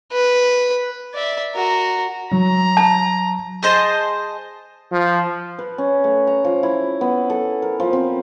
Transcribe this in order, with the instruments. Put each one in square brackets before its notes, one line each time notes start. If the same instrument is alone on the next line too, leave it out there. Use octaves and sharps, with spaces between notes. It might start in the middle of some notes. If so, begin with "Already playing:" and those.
[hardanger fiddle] B4
D5 E5
F#4 A#4
[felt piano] F#3 [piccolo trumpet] A#5
[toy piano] A5
[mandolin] G#4 C5 D#5 A5
[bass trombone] F3
[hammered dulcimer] B4
C#4
A3
A#5
F3
E4
B3
A4
A#4
F3
C4